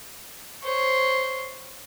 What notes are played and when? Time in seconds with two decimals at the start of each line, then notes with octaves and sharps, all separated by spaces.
0.63 C5 C#5